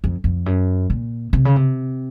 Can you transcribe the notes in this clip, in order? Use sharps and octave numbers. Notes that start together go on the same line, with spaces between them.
F2
F2
F#2
A#2
C3
C#3
C3